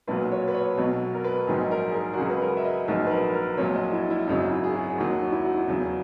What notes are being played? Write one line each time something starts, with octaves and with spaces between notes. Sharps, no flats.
B1 A#2 F#3 B4
C#5
B4
C#5
B1 B2 F#3
A#4
B4
A#1 G#2 D#3 F#3 G#4
A#4
G#4
A#4
F#4
C#2 C#3 F#3 G#4
B4
A#4
E5
D#5
A#1 G#2 D#3 F#3 D#5
B4
A#4
A#4
A#1 A#2 F#3 C#5
D#5
E4
E4
G#1 F#2 C#3 F#3 D#4
E4
G#4
F#4
G#4
D#2 D#3 F#3 F#4
E4
F#4
E4
E2 C#3 F#3